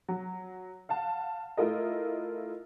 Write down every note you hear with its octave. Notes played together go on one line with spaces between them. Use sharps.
F#3
F5 F#5 A5
A3 E4 F4 A#4 D#5